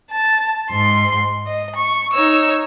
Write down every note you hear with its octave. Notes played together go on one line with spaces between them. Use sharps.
A5
G#2 C6
D#5
C#6
D#4 C#5 E6